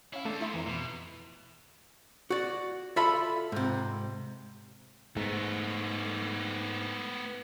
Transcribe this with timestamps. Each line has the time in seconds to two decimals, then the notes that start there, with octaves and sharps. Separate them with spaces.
0.13 C#4 E4 F5
0.25 E2 A3 D4 A4
0.41 E4 E5 C6
0.53 F2 E3 A#5
0.66 B2
2.30 F#4 D5
2.96 F4 A4 D5 E5 A5 B5
3.52 G#2 C3
5.17 G#2 A3 B3